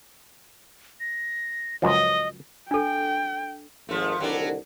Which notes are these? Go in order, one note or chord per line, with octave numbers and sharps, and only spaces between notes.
A#6
C#2 F#2 F3 D#5
D4 A4 G5
G#1 F3 A3
C2 D3 D#3 F#3 G3 D4